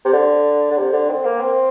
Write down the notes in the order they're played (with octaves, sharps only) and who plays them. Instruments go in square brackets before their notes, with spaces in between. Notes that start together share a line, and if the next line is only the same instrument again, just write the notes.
[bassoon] C3
D3
D3
C3
D3
C4
A#3
C4